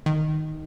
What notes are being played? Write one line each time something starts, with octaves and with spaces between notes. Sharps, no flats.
D#3